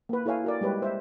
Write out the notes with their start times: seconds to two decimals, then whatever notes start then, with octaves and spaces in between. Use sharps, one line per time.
0.09 A#3 B4
0.26 E4 A4 B4 C#5 F5 G#5
0.44 F#4 A#4 D5
0.61 G3 G#3 G4 B4 C#5
0.82 C5 E5